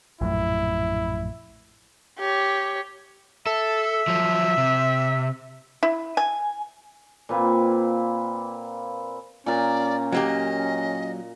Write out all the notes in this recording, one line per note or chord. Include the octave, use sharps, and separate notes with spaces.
A#1 F#2 A2 E4
G4 C#5
A4 E5
F3 F#3
C3
E4
G#5
A#2 A#3 C4 B4
A#2 C#4 A#4 D5
F#3 A#3 G4 D#5